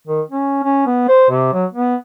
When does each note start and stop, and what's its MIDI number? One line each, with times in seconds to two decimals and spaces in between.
0.07 0.22 51
0.30 0.63 61
0.64 0.83 61
0.86 1.06 59
1.08 1.27 72
1.30 1.53 48
1.53 1.65 54
1.73 1.96 59